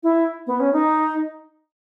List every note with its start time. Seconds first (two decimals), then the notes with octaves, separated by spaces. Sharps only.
0.03 E4
0.47 B3
0.60 C#4
0.73 D#4